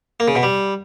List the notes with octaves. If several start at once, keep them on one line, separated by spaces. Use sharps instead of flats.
A#3
C#3
B2
G3